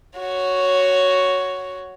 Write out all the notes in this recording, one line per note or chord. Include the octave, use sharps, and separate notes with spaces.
F#4 C#5